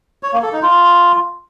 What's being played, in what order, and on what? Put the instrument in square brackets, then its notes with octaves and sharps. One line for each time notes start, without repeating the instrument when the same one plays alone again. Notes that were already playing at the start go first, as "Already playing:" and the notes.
[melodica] C#5
A#3
A4
D#4
F4